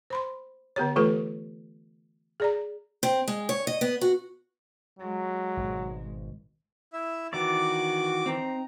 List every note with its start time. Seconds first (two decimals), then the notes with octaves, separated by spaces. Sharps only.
0.10 C5 B5 C6
0.76 D3 B3 G4 C#5
0.96 E3 A3 F4 G4 A4 B4
2.40 G#4 D5 A#5
3.03 C4
3.28 G#3
3.49 C#5
3.67 D#5
3.81 B3
4.01 F#4
4.99 F#3 G#3
5.57 G#1 G#2 B2
6.93 E4 E5
7.33 D#3 E3 B3 F#4 D5 D6
8.26 C4 D#4 G5 A#5